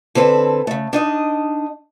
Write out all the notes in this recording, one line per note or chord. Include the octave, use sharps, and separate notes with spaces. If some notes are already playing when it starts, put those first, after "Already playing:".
D3 C4 A4 B4
C#3 A3
D4 D#4 D#5